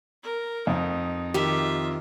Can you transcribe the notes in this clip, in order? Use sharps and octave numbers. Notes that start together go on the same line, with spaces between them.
A#4
F2 D#4
D#3 F4 G4 E5